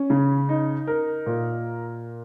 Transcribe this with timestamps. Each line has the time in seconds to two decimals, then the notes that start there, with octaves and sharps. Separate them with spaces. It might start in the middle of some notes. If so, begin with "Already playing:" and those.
Already playing: C#4
0.10 C#3
0.49 D#4
0.87 A#4
1.26 A#2